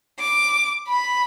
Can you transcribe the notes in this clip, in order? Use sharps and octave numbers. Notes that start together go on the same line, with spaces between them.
D6
B5